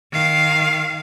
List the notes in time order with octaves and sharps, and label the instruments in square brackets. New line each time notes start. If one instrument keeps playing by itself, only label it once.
[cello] D#3 F5